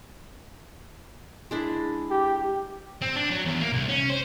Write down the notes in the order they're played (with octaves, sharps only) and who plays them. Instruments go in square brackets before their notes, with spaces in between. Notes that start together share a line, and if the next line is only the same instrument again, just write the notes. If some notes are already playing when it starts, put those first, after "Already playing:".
[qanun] G#3 D4 E4
[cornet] G4
[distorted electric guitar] C4
D4
F#3
E2
A#3
C2
C#4
C5